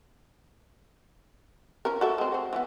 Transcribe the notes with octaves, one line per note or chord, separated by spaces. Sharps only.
F3 C#4 A#4
F#4 A4 E5
G#3 C4
F#4 C5
E3 F#3 B3